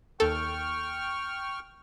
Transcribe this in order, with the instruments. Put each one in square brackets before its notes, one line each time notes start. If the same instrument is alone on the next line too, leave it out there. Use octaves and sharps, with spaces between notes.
[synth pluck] D#2 A4 [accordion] G5 C#6 F6